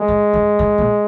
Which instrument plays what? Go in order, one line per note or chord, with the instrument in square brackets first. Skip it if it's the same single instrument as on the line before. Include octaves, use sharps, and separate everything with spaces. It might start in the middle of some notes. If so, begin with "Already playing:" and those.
Already playing: [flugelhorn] G#3
[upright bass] G#2
G2
G#2
A#2